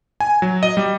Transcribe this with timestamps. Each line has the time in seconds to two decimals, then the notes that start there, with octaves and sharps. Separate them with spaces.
0.20 G#5
0.42 F#3
0.63 D#5
0.77 G3